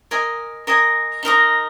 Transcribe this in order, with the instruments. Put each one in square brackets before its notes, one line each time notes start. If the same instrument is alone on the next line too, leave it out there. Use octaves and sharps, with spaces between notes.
[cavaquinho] A#4 D#5 G#5
A#4 D#5 G#5
D#4 A#4 D#5 A#5